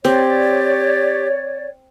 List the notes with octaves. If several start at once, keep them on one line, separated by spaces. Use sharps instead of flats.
C4 G4 C#5 D5